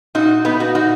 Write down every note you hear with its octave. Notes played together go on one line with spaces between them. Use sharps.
A#2 D#4 F#4
A#2 B3 D#4
D#4 F#4
A#2 D#4 F#4